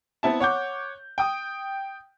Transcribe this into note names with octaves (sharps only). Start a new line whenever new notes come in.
B3 C4 E4 A5
C#5 F#5 D6 G6
G5 D#6